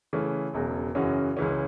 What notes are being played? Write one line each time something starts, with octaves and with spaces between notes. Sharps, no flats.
C#3 E3 A3 C#4
E1 E2 C#3 F#3
F#2 C#3 E3 C#4 F#4
C#2 C#3 E3 C#4